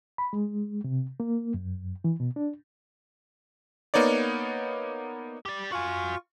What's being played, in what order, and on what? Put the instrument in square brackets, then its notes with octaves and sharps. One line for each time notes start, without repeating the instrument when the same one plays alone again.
[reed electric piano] B5
G#3
C3
A#3
F#2
E3
B2
D4
[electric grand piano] A#3 B3 D#4 C#5 D5
[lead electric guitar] G4 D5
[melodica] F4 C#6 [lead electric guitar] F#4 G#5